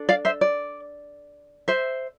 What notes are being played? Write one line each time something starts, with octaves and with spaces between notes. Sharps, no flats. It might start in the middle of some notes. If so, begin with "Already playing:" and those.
Already playing: D4 A4
D5 F5
C5 E5
D5
C5 E5